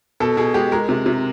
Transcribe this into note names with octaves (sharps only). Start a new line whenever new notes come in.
B2 A4
B2 G#4
G#3 G4
G#3 A#4
C3
C3